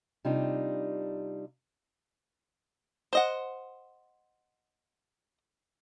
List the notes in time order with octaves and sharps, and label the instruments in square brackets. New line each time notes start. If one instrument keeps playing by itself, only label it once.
[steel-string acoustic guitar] C3 G3 D4 D#4 F4
[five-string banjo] C5 D#5 F#5